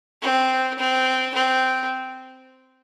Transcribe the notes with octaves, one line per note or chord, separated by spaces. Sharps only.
C4
C4
C4